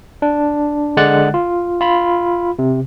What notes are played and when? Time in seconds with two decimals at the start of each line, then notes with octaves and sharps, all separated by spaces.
0.22 D4
0.97 D3 G#3 D5 F#5 F#6 A6
1.34 F4
1.81 F4 B5
2.59 C3